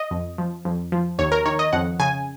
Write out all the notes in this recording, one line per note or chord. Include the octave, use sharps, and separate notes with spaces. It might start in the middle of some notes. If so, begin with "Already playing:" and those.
Already playing: D#5
F2
F3
F2
F3
D#2 C#5
A#4
D#3 C#5
D#5
F2 F#5
C#3 G#5